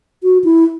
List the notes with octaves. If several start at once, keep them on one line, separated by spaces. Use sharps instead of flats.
F#4
E4